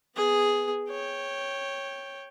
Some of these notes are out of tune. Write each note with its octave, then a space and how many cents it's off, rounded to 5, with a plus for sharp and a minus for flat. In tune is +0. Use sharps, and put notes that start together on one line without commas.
B3 +0 G#4 +0
C#5 -10 G5 +0